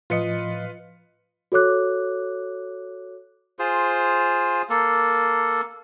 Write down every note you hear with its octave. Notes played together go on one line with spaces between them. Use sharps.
A2 F3 F4 B4 D#5 C#7
F#4 A4 C#5 D6 F#6
F4 G#4 C5
A#3 A4